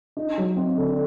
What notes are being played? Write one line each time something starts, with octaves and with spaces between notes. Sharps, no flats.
D#4
F#3
C4
D3